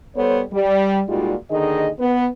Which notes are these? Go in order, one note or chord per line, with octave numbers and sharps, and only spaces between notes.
G3 B3 A4 C5 C#5
G3
A#2 G3 G#3 D#4 F4 F#4
D#2 D3 D#3 D#4 G#4 D#5
B3 B4